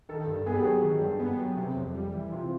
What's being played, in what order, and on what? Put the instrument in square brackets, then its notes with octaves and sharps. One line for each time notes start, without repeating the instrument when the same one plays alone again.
[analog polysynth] D#3 [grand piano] A4
[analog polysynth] G2
[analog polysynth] B3 [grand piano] G#4
[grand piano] G4
[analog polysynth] F#3 [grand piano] G#4
[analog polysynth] D#3
G2
B3
F#3
C3
F2
G3
E3
[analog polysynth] C3 [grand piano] F4